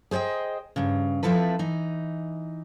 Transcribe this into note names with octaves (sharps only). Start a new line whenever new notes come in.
G#4 C5 C#5 D#5 G5
G2 C#3
F3 C4 E4 A4 B4
E3 D#4